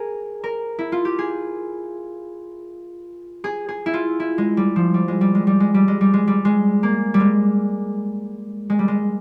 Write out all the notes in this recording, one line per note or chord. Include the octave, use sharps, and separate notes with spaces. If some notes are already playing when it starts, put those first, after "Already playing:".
Already playing: G#4 A#4
A#4
E4
F4
G4
G#4
G#4
G#4
E4
F4
E4
G#3
G3
F3
G3
G#3
G3
G#3
G3
G#3
G3
G#3
G3
G#3
G3
G#3
A#3
G3
G#3
G#3
G3
G#3